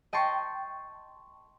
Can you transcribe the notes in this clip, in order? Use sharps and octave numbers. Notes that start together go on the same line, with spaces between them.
D#5 G5 A5 C6 C#6